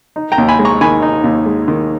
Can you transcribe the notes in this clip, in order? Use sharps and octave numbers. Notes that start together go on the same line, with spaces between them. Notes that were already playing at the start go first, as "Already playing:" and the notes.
D#4
G5 A#5
D#2
G#5 B5
G#3
A#5 C#6
D#3 G#5 B5
D#4
D#2
G#3
D#3